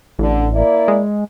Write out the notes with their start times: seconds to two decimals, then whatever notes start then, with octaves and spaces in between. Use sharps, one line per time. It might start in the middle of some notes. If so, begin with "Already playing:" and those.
0.19 A1 D3
0.53 A#3 E4 D5
0.88 G#3